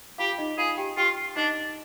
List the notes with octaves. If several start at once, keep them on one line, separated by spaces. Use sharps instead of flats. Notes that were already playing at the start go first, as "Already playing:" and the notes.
F4 G4 F5
D#4 D#5
F4 G#4 F5
G4 G5
F4 G4 G5
D4 D#4 D#5